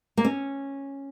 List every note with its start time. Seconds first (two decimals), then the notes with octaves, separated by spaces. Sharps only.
0.17 A#3
0.25 C#4